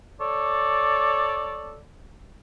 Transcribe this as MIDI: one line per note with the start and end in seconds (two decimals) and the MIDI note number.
0.19 1.80 69
0.19 1.80 73
0.19 1.80 74